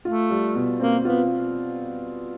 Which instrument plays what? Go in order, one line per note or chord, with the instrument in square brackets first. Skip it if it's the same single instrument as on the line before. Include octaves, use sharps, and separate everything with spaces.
[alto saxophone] A3 [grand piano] F4
[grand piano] G3
B2
[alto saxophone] A#3 [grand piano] C4
[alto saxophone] B3 [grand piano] F4